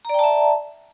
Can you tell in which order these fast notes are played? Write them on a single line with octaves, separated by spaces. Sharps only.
A#5 D5 G5 A5 E5